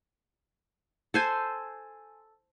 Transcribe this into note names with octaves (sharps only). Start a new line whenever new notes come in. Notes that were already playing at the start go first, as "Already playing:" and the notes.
A4 C5 G#5